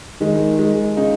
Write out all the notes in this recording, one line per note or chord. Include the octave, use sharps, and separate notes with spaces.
D#3 G#3
G#3
C#3 D#4